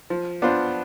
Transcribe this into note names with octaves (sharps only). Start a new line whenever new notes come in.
F3
B3 D4 F4 C5